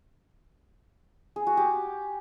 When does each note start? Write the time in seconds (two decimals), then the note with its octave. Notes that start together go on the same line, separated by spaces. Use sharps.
1.36 G#4
1.47 F#4
1.57 G4